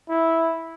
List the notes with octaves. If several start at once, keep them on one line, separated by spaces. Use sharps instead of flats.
E4